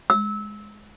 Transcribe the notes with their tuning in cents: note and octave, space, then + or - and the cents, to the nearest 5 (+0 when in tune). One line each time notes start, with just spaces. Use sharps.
E6 -20